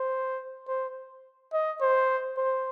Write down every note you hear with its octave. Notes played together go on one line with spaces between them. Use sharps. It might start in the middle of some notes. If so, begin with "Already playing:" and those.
Already playing: C5
C5
D#5
C5
C5